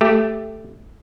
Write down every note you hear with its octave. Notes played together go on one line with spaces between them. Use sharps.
A3 G4